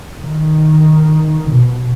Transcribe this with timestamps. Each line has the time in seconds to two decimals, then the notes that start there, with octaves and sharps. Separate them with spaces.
0.21 D#3
1.48 B2